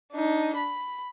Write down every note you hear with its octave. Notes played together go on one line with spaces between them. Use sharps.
D4 D#4
B5